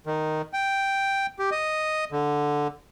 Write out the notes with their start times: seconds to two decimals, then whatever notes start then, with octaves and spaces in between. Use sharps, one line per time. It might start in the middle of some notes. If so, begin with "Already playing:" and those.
0.07 D#3
0.53 G5
1.39 G4
1.51 D#5
2.12 D3